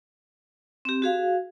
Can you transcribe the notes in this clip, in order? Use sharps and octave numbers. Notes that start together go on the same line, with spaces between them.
C4 G4
F#4 G#4 F5